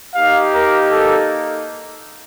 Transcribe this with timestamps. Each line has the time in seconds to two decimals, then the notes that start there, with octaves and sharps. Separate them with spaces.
0.15 A#3 D#4 G4 F5
0.54 A#4
0.91 A4